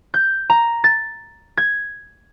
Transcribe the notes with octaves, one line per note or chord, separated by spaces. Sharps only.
G6
A#5
A6
G#6